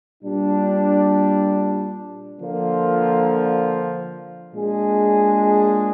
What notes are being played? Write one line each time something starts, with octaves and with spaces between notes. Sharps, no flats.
A#2 G3 D4
D3 F3 A#3 F4
A#2 G#3 D4 G#4